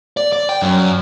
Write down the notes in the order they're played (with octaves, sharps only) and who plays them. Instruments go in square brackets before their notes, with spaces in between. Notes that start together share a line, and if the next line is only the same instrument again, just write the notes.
[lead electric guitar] D5
D5
G5
F#2